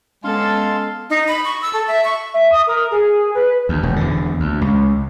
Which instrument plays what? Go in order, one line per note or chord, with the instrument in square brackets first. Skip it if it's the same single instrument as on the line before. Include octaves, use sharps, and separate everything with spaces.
[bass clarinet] G#3 [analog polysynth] B3 C#4 [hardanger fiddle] A4 [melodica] F5 C6
[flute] D#4
B5
C#6
E6
A4
E5
C#6
[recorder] E5
D#6
A#4
G#4
B4
[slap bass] D2
E1
E2 D3
D2
C#2